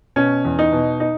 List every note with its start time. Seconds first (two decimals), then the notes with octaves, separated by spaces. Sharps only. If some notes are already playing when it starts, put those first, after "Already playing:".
0.16 B2 C#4
0.45 E2
0.59 D#4
0.72 B2
1.00 D#4